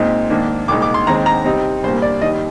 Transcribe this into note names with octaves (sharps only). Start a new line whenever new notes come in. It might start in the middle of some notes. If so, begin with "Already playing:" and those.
Already playing: A#2 G#3 C4 D#4
G#2 D#3 A#3 D4
C2 A#2 G#3 D#4 D6
D6
C6
D#2 D#3 G#3 C4 A#5
A#5
C3 G3 C4 D#4
C2 A#2 G3 A#3 C5
D5
D#2 D#3 G3 D#5